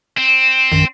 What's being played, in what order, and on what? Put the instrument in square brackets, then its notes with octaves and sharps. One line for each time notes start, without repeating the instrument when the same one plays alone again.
[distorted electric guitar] C4
[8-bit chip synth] A#1 F#2 D#3